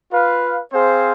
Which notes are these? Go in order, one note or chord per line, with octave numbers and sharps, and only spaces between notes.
F4 B4 F5
C4 G#4 C5 F5